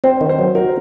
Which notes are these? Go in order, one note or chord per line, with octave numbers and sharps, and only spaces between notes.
C4 C5
D#3
C5
F#3
F#4 A#4